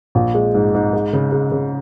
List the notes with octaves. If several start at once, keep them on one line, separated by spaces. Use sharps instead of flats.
A#1
G#3
G#2
G#2
G#3
C#3
G#3
C#3